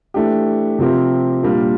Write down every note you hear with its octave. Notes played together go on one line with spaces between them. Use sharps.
E3 A3 D4 G4
C3 F3 C4 G4 A#4
A#2 G3 D4 F4 A#4